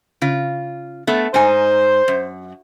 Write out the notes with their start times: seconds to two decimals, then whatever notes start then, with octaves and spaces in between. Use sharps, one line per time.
0.22 C#3 F4
1.07 A3 B3 A4
1.34 G#2 D#4 C5 G#5
2.08 F#2